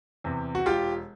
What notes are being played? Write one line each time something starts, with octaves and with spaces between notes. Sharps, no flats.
E2 C3
F#4
E1 F4 G4